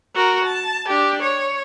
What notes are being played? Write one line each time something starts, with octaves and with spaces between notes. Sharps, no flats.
F#4 A#4
A5
D4 G4
C#5